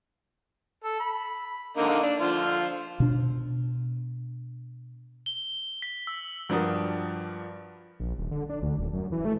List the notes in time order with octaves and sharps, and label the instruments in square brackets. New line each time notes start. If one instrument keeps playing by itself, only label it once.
[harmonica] A4
B5
D3 A#3 D#4
D4
D3 F3 F4
[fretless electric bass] B2 D4
[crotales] G7
B6
E6
[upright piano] G2 F3 D4 F#4 A#4 D#6
[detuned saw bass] A#1
D#1
D3
D4
D2
D#1
F#2
E3
A3